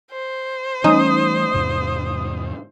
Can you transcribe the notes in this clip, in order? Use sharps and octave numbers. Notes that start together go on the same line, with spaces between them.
C5
E3 G3 A3 C#4 D#4 D#6
E2 G#2 C3